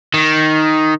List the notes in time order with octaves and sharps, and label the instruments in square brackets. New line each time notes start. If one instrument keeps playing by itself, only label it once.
[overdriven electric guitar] D#3